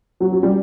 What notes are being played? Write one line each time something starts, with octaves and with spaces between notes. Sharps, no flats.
F#3
F#3
G3